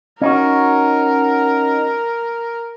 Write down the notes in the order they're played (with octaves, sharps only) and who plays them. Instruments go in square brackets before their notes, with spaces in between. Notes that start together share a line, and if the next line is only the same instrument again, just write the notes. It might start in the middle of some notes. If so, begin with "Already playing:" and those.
[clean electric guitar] C#4 D#4 F#4 [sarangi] A#4